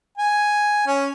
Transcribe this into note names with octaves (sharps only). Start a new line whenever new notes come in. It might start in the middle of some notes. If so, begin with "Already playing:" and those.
G#5
C#4